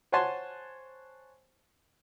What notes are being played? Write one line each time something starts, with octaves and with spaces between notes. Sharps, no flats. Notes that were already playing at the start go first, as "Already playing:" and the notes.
C5 C#5 F#5 G#5 A5 C6